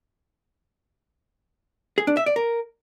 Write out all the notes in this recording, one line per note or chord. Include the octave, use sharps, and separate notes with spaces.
G#4
D4
E5
D5
A#4